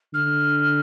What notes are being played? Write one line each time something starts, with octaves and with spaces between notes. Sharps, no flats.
D3 F6